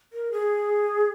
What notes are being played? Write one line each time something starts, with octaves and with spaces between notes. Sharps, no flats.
A#4
G#4